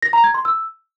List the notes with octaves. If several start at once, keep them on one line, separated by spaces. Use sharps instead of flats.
A#6
A#5
G#6
C6
E6